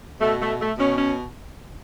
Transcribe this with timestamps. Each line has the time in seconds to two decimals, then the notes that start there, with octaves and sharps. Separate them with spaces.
0.21 B2 A3
0.41 A3
0.60 A3
0.78 B2 C#4
0.98 C#4